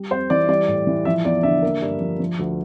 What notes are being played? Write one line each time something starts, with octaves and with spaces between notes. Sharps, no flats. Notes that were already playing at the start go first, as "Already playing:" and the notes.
Already playing: G3
F2 C5
E3 D5
G3 D5
A2
E3
F3 E5
E2 D5
D3 E5
A#3
G2
F3
F3
D2